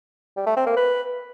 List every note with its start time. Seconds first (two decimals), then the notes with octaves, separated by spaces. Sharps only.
0.37 G3
0.46 A3
0.56 C4
0.66 A#3
0.76 B4